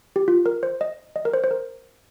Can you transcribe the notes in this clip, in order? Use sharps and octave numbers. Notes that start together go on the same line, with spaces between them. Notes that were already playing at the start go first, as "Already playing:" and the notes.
G4
F4
A#4
C5
D#5
D#5
A#4
C5
C5
A#4